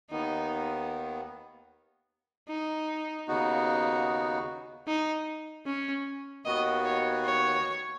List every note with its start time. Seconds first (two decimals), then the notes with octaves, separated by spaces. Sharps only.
0.10 D#2 D#3 B3 D#4
2.49 D#4
3.28 D#2 C#3 B3 D#4 F#4
4.87 D#4
5.66 C#4
6.45 D#2 D#3 B3 F#4 D#5
6.85 C#5
7.25 C#5